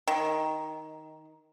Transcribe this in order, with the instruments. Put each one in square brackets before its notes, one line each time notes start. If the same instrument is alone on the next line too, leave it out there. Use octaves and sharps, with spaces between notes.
[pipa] D#3